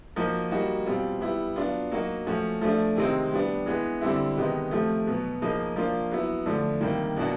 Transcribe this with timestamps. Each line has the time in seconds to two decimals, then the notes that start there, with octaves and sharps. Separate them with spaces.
0.16 F3 A#3 D#4 F#4
0.51 G3 A#3 D#4 F#4
0.86 B2 G3 C4 F4
1.21 G3 B3 E4
1.56 F#3 B3 D4 F4
1.91 F#3 A#3 D#4 F#4
2.27 F3 A3 C#4 F#4
2.61 F3 A3 D4
2.97 C3 D#3 G#3 C4 D#4
3.32 G3 B3 D4
3.66 E3 G#3 B3
4.01 D3 G3 C4 E4
4.37 C3 D#3 G#3 B3 D#4
4.71 C3 F3 A3
5.07 B2 F#3 B3
5.41 C#3 F3 A#3 D#4
5.76 F3 A#3 D4 F4
6.11 F#3 B3 E4
6.46 D3 F3 A3 D4
6.81 C3 D#3 G3 A#3
7.17 B2 F#3 A#3 D4 F#4